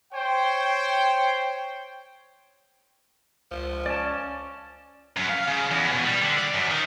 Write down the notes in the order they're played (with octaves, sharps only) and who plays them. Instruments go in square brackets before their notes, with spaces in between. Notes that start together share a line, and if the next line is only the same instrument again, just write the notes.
[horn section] C5 C#5 G5
[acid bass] C#2 [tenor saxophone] F3
[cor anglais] C#4 [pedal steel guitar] D5 A5
[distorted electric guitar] F#2
F5
C#3
E2
B2
G3
D3
D5
F#2
D#3